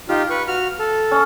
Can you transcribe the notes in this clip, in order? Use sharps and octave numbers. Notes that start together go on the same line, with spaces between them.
D#4 F4 G4 F5
B4 C#6
F#4 F6
A4
C#4